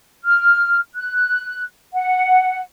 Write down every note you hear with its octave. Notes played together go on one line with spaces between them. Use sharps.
F6
F#6
F#5